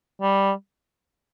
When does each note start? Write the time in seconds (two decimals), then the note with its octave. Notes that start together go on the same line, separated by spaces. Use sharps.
0.21 G3